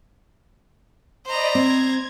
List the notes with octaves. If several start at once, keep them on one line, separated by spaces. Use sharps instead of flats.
C5 D5 D#5 A#5 B5
C4 G#6